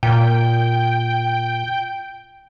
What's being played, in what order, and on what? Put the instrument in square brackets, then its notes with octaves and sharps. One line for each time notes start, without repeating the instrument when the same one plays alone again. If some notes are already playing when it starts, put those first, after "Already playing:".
[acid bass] A#2 [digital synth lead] G5